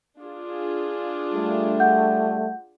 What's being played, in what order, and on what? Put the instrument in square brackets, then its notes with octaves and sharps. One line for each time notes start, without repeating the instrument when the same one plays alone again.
[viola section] D4 F4 G#4
[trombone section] G3 A3
[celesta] F#5 G6